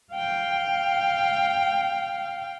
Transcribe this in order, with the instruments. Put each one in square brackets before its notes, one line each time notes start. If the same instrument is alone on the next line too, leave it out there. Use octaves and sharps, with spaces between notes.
[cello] F5 G5